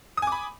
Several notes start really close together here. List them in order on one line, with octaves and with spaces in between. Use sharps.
D#6 G#5 D6 B5